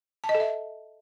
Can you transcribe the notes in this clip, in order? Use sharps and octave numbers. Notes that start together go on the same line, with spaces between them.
A5
D#5
A4
E5